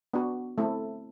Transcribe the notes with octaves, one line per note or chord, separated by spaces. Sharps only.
B3 D4 F#4
A3 C4 E4 A4